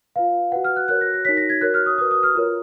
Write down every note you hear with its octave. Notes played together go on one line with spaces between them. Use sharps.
F4 B4 F5
F#4 B4 F#5
F6
F#6
F#4 A#4 C#5 F#6
A#6
A#6
D#4 F#4 C#5 B6
A#6
G#6
F#4 A#4 C#5 F#6
F6
D#6
F#4 B4 D#6
D#6
F6
F4 A#4 C#5